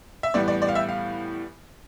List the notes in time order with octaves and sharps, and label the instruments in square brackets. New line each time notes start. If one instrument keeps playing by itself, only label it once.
[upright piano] E5
A2 E3 G3 B3 D5
D5
D5
F5
E5
F5